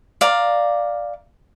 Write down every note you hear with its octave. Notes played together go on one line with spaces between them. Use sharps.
D5 F5 A#5